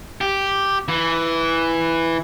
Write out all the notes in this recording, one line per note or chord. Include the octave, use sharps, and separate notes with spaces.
G4
E3